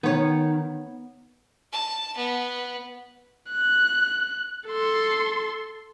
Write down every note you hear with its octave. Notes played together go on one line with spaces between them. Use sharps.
D#3 B3 C#5
A5
B3
F#6
A4 C6